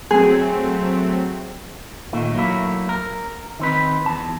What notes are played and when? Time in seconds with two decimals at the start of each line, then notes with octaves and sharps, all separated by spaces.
0.11 F#3 A3 C4 G#4
2.13 A#2 D#3 A3
2.35 F#3 A3 A#3 E4
2.89 A#4
3.59 D#3 C4 B4
4.06 E2 A5